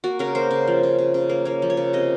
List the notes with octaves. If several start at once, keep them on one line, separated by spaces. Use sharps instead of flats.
A#3 F#4
C#3 A#4
A#3 C5
C#3
F3
C#3
C#3
C#3
A#3
A#3 C#5
F3
C#5
C#3
C3 D#5